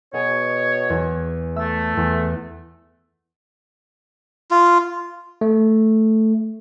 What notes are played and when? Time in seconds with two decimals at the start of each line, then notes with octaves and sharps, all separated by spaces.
0.14 B2 G#4 C#5
0.90 E2
1.56 A3 E6
1.97 E2
4.51 F4
5.41 A3